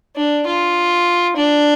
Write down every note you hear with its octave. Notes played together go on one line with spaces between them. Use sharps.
D4
F4
D4